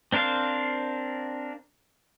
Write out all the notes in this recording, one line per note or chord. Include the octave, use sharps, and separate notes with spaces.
C4 D4 A#4 C5 F5